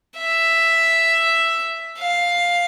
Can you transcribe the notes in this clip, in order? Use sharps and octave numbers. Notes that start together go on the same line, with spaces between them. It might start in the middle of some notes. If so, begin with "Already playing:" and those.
E5
F5